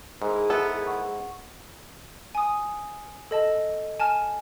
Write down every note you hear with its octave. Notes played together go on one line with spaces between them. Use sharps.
G#2 E4 G#4 A#4
B3 A4 E5
F#5 C#6
G#5 D#6
A4 D#5 A5
G#5 A5 F6